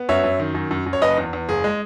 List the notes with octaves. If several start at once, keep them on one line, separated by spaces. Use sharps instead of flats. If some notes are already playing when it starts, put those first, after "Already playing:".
Already playing: B3
F#2 C#5 E5
F#2
D#3
F#2
F#2
F#2
C#5
F#1 B4 D#5
E2
E2
F#1 G#4
G#3